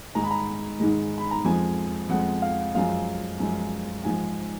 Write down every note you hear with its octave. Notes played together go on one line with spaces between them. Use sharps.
G#2 D#3 G#3 A#5
B5
A#5
G#2 D#3 G#3
B5
A#5
F2 F3 G#3 G#5
F2 F3 G#3 F#5
F5
F#2 F3 G#3 F5
F#2 F3 G#3
G#2 F3 G#3 G#5